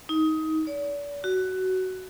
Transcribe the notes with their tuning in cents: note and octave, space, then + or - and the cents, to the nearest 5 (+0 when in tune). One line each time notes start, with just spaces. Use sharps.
D#4 +20
D5 -40
F#4 +15